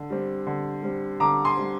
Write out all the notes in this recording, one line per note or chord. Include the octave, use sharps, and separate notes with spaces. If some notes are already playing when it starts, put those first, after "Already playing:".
Already playing: D3
G3 C4
D3
G3 C4
D3 A#5 D6
G#5 C6
G3 C4